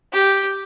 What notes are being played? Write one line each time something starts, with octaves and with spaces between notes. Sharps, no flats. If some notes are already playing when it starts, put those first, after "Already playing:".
G4